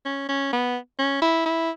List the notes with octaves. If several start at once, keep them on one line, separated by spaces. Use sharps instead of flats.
C#4
C#4
B3
C#4
E4
E4